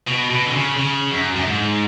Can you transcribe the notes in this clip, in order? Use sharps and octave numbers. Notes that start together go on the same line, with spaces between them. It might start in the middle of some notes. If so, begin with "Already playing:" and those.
B2
B2
D3
C#3
C#3
F#2
F#2
G#2